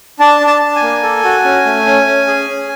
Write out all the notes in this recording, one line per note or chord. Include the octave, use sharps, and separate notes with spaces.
D4 A5
D4
A5
D4
G#5
A#3
A4
F#4
C#4
A3
C#4
C#4
G#4
C#4